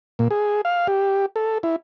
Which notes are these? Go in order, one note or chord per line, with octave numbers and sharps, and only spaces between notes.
A#2
G#4
F5
G4
A4
E4